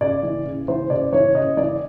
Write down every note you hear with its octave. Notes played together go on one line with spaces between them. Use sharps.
C#3 D5
E3
C#3
E3 C5
C#3 D5
E3 C#5
C#3 D#5
E3 D5